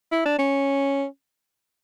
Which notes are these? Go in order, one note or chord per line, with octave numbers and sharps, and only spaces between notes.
E4
D4
C#4